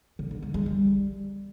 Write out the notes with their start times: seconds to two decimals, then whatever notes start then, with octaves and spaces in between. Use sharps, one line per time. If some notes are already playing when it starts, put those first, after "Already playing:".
0.19 C#3
0.31 D3
0.42 G#3
0.54 G#3
0.66 G3